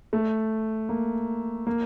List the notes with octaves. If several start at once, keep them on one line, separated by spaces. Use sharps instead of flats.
A3
A#3
A#3